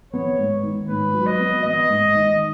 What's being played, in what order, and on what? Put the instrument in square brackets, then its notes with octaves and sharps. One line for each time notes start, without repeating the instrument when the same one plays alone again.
[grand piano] B3 [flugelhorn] C#5
[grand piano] G#2
D#3
[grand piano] G#2 [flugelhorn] B4
[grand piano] F#3
[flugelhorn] D#5
[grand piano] B3
[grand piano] B3 [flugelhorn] D#5
[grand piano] G#2
D#3